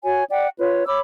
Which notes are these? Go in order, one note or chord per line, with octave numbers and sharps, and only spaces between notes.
F#4 C#5 G#5
D5 F#5 G5
F4 B4 C#5
C#5 B5 D6 E6